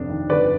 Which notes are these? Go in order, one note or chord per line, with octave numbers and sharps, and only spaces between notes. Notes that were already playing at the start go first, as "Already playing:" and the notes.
Already playing: G1 F2 C3 D4
D#3
G1 B4 D5